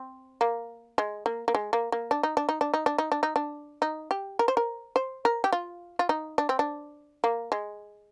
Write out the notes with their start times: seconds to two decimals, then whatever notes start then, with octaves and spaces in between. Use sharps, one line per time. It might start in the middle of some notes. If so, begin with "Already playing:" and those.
Already playing: C4
0.41 A#3
0.98 G#3
1.26 A#3
1.48 A#3
1.55 G#3
1.73 A#3
1.92 A#3
2.11 D4
2.23 D#4
2.37 D4
2.49 D#4
2.61 D4
2.74 D#4
2.86 D4
2.98 D#4
3.12 D4
3.23 D#4
3.36 D4
3.82 D#4
4.11 G4
4.39 A#4
4.48 C5
4.57 A#4
4.96 C5
5.25 A#4
5.44 G4
5.53 F4
5.99 F4
6.09 D#4
6.38 D4
6.49 C4
6.59 D4
7.24 A#3
7.52 G#3